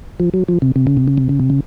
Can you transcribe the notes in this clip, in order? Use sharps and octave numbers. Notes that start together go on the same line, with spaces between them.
F3
F#3
F3
C3
C3
C#3
C3
C#3
C3
C#3
C3
C#3